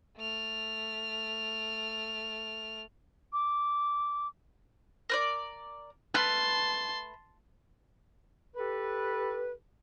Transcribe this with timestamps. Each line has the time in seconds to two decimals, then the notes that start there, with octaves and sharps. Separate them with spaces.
0.17 A3 F6
3.33 D6
5.09 A#4 B4 D5
6.14 A3 B4 A5 C6 F6
8.56 G4 A4 B4